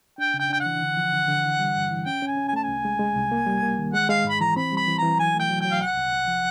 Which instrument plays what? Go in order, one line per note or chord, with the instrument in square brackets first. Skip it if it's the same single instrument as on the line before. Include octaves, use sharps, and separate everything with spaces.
[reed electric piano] D4 [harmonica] G5
[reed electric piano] C#3
[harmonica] G5
[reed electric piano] D4 [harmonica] G5
[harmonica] F#5
[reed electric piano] E3
D3
F3
D3
D3
E3
G3
G2
E3
[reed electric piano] C#4 [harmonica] G5
[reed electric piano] C#4 [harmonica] G#5
[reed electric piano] C#4
[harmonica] G#5
[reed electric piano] A3 [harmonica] A5
[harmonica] G#5
[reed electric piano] C2
G#3
G#3
C2
A#3
G3
A#3
D#3
[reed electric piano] G#3 [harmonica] F#5
[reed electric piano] G#3 [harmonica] F5
[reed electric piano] G#2 [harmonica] B5
[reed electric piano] E3 [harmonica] A#5
[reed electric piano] C4 [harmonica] B5
[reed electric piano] G3 [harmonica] B5
[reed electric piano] E3
[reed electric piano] E3 [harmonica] A#5
[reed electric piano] F#3 [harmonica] G#5
[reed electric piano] A3 [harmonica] G5
[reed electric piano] F#3
[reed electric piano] F#3 [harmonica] G5
[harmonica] F5
[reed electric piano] C2 [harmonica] F#5
[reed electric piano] C2
C2
F3